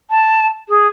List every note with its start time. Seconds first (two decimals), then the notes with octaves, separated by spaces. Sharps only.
0.10 A5
0.69 G#4